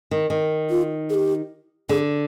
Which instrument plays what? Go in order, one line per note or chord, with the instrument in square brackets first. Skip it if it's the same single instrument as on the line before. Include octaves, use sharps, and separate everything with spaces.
[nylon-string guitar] D#3
D#3
[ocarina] F4
G#4
G4
[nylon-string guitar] D3 [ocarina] G#4